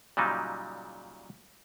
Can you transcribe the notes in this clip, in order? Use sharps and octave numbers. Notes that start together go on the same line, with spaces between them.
A#2 C#3 F#3 G3 D#4